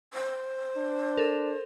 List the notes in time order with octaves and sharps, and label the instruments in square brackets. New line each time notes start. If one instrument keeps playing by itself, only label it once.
[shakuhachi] C5
[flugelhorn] D4
[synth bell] A4 A#4